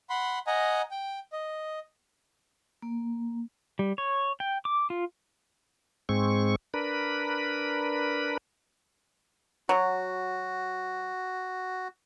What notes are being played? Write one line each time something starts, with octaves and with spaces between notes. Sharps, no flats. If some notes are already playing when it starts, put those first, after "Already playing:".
F#5 B5 C6
D#5 F#5 G#5 A#5
G5
D#5
A#3
G3
C#5
G5
D6
F4
G#2 G#3 C4 C#6
D4 A#4 B4 B5
F#3 F#4